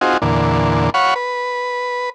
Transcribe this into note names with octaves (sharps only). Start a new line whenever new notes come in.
C4 D#4 F4 F#4 G#4
E2 A#2 D3
C#5 F5 F#5 B5 C#6
B4